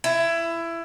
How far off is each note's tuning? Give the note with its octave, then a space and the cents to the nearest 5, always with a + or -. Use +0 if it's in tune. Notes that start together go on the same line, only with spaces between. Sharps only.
E4 +20